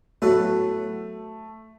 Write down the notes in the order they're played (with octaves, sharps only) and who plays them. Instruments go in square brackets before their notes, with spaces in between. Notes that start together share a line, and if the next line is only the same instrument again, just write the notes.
[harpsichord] A2 F#3 B3 F#4 A4 [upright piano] A3